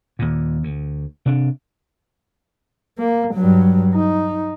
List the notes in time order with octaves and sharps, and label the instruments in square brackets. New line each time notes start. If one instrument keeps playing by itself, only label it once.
[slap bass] D#2 A#2
D2
C3 D4
[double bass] A#3
G2 F#3
D#4